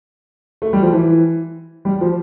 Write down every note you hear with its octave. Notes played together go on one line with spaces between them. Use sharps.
A3
G3
F3
E3
G3
F3